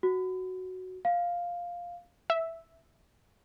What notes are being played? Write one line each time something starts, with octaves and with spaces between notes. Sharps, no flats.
F#4
F5
E5